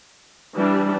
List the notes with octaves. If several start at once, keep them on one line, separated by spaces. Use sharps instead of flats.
E3 G3 D4